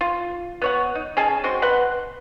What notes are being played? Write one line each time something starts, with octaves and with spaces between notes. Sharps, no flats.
F4
B3 C#5 F#5
D#4
C#4 G#4 G#5 A5
G#3 C4 F#4 C6
B4 F#5 C6